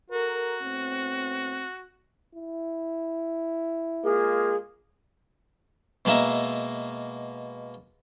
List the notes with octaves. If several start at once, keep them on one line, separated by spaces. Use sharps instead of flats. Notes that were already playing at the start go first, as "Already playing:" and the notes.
F#4 A4 A#4
A2 B3 C4
E4
G#3 A#3 F4 G#4
B2 G#3 A#3 E5 A#5